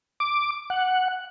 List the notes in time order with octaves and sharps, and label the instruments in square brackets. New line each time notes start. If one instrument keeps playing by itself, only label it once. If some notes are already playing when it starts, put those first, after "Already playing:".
[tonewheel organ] D6
F#5